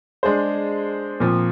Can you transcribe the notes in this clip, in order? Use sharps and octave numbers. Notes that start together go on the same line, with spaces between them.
G#3 D4 G#4 C5
A#2 F3 C4